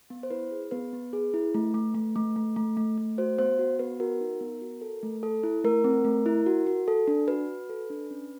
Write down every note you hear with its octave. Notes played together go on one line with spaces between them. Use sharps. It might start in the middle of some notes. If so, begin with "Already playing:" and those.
B3
C5
E4 B4
G#4
B3 B4
B3
G#4
E4
A3
A3
A3
A3
A3
A3
A3
A3
F#4 C5
B3 C5
F#4
B3 B4
F#4 A#4
D#4
B3
F#4
A4
A3
A4
E4
A3 A#4
C4
A3
E4
F#4
F#4
A4
D4
F#4 B4
F#4
A4
D4
C#4